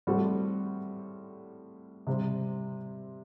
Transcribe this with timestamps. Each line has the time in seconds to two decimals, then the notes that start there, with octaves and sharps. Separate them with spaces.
0.07 A2 G3 C4 F#4 A4
2.07 C3 G3 C4